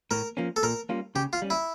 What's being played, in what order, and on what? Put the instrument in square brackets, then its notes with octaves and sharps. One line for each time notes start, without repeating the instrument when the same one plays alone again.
[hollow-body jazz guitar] A2 [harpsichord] A#4
[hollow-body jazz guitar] F3 A#3 C#4
[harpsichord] A4
[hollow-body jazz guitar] A#2 [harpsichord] A#4
[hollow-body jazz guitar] G3 A#3 C#4 F4
[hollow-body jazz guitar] C#3 [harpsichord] G4
[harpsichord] F4
[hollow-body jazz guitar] G3 C#4
[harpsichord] E4